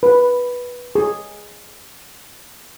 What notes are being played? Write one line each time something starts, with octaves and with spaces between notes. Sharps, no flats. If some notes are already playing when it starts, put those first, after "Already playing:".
B4
G#4